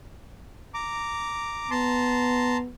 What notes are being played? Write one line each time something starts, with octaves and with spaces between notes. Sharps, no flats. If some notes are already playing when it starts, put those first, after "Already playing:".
A#5 D6
B3 A5 A#5 C6